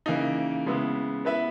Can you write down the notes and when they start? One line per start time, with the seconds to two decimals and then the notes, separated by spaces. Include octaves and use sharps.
0.06 C#3 E3 A#3 D#4
0.66 C#3 G#3 B3 E4
1.25 B3 E4 B4 E5